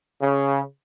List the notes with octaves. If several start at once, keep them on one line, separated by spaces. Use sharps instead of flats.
C#3